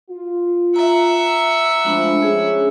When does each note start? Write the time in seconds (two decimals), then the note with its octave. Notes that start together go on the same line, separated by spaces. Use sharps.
0.10 F4
0.76 E5 F#5 A#5
1.84 F3 G#3 A3 D4 B5
2.22 C#4 G#4